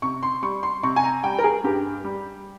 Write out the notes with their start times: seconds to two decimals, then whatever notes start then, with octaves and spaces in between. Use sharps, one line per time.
0.02 C3 C#6
0.23 C6
0.42 G3 C#6
0.63 C6
0.83 C3 C#6
0.96 G#5
1.03 A#5
1.24 G3 G5
1.39 A#4
1.44 G#4
1.64 G2 G4
2.04 G3